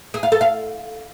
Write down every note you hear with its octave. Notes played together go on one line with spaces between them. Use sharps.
G#4
F5
A4
F5